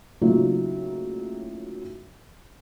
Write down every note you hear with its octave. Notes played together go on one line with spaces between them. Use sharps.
A2 C#3 F#3 A#3 D#4 F4